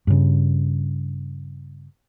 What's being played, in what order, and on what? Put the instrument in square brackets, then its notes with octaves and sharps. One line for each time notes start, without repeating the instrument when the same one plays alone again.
[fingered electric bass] G2 C#3